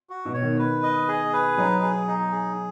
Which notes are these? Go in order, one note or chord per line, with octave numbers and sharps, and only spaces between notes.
F#4
B2
C#5
D#3
B4
D#5
G#4
B4
F#3 D#4
G#4
D#4
G#4